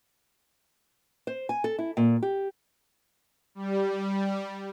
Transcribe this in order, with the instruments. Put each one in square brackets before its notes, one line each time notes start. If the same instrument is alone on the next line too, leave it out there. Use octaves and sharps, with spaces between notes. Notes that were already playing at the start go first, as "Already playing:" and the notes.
[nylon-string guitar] C5
G#5
A4
E4
A#2
G4
[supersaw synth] G3